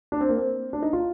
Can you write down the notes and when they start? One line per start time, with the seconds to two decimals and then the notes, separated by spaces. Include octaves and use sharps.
0.12 D4
0.20 C4
0.29 A#3
0.37 C4
0.73 D4
0.82 D#4
0.93 F4